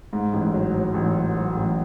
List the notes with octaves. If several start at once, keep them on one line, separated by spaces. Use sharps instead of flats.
G#2
A1
F#3
F#3
A1
F#3
F#3
A1